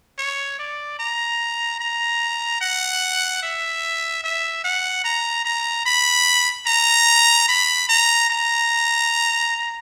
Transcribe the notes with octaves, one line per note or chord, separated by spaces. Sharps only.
C#5
D5
A#5
A#5
F#5
E5
E5
F#5
A#5
A#5
B5
A#5
B5
A#5
A#5